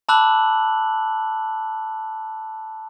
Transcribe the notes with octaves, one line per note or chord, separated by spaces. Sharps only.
A5 B5 D6 E6 F#6 F#7